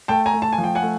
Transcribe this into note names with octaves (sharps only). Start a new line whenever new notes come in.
A3 G5 A5
G#5 A#5
A3
A5
G#5
F3
G5
F#5 G#5
A3